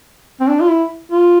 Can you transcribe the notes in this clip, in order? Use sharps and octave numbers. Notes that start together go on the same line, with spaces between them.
C4
D4
F4
E4
F4